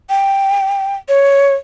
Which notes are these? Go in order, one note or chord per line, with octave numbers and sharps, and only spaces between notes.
G5
C#5